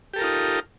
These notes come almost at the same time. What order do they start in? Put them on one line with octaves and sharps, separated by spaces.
G4 A4 A#4 F4 D#4